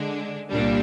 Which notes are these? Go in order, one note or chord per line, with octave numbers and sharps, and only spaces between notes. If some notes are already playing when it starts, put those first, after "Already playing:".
Already playing: D3 G#3 D4
C2 A#2 G3 A#3 D4